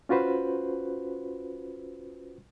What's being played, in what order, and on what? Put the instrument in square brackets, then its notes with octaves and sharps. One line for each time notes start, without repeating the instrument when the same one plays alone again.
[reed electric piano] C#4 F4 F#4 B4 C5